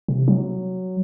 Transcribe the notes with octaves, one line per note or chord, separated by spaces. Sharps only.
C3
F#3